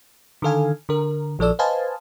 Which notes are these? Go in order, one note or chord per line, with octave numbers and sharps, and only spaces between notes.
D3 D#3 A4 F5 G#5
D3 A#4
A#1 F3 A4 D5 E6
B4 C5 D#5 F5 G#5 A5